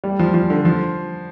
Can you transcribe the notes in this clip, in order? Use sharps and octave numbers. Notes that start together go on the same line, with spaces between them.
G3
F3
F3
D3
F3